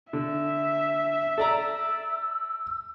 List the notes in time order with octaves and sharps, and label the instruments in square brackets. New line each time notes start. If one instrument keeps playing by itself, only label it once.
[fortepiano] D3 [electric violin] E5
[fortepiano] A4 D5 A#5 [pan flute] E6